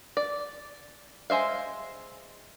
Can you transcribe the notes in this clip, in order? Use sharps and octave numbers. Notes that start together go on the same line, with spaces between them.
D5
G#3 C5 E5 F5